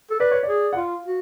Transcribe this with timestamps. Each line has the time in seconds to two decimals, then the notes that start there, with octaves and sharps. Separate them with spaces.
0.11 A4
0.20 B4 D5
0.31 C#5
0.43 D5
0.49 G#4
0.73 F#5
0.76 F4 F5
1.06 F#4